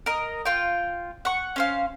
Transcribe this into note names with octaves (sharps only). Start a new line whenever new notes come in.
A#4 D#5
F4 G5
F#5 C#6
C#4 C5 F5